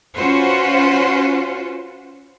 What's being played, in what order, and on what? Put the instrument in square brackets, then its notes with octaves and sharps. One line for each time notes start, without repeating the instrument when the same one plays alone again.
[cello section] C#4 F4 F#4 B4 C5